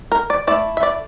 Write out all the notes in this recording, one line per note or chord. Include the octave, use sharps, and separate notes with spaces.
A#4
D5
A3 E4 D5
E5
D5